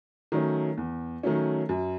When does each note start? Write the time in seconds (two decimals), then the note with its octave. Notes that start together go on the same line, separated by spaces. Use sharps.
0.32 D#3 F#3 A3 C#4
0.78 E2
1.23 D#3 F#3 A3 C#4
1.69 F#2